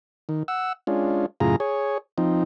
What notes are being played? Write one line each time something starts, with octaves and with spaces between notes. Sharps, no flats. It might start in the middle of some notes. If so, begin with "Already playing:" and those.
D#3
F#5 E6
G#3 C#4 D4 F4
F#2 A2 C#3 F4 G#4 A#5
G#4 C#5
F3 C4 D#4